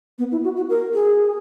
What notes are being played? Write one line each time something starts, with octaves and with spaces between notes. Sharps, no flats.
B3
E4
F#4
F#4
A#4
G#4